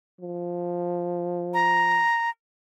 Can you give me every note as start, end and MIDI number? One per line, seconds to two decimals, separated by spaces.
0.20 2.04 53
1.54 2.30 82